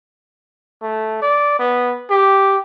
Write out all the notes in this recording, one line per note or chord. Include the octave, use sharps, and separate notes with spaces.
A3
D5
B3
G4